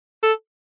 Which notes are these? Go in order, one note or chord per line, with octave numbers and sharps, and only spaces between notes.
A4